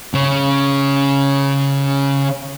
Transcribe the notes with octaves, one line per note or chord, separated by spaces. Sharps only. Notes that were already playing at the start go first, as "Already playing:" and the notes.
C#3 C#4